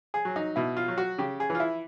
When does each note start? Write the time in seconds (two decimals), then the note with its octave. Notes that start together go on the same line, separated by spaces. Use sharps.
0.14 G#4
0.25 F#3
0.36 D#4
0.56 B2 E4
0.77 F4
0.88 F#3
0.98 F#4
1.19 C#3 G4
1.40 G#4
1.50 E3
1.55 F4
1.60 E4